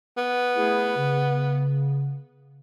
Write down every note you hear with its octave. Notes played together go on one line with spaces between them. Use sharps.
B3
A3 E4 G#4
C#3